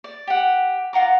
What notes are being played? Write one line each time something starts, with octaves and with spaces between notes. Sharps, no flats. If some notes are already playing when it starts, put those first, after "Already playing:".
D5
G4 F#5
F4 F#5 A#5 D6